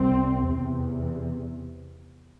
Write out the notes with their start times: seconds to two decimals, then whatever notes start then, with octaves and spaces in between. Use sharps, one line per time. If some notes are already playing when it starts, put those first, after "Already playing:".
Already playing: C2 C3 C4
0.48 E2 C3